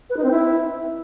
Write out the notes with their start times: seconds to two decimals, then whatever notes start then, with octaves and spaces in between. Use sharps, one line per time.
0.10 B4
0.17 D#4
0.24 C4
0.31 E4